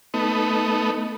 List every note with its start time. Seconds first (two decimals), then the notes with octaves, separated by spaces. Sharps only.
0.14 A3 B3 D#4